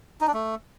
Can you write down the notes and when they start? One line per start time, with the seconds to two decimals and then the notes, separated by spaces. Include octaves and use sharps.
0.21 D#4
0.27 D4
0.34 A3